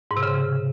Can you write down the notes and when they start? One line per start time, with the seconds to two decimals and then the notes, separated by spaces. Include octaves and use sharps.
0.11 G#2
0.17 C3
0.23 C#3